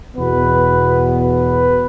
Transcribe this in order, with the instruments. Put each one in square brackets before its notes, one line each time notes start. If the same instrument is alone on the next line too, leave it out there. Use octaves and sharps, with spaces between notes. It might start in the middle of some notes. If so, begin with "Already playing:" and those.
[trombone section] E2 B2 B3 B4
B4